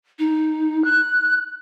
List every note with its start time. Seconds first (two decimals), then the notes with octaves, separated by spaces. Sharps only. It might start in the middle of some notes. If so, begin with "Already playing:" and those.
0.18 D#4
0.84 F#6